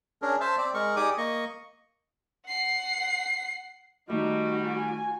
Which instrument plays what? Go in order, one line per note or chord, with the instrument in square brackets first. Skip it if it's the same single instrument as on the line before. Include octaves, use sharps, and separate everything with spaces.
[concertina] C#4 D4 G#4 A#4
C5 E5 A5
C4 D5
G#3 A#4 C#6
D#4 G4 G#4 D5 D6 D#6
A#3 D#5 C#6
[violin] F#5 C7
[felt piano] D#3 A3 [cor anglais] G3 [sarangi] D#4 [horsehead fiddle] F#4
[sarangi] G#5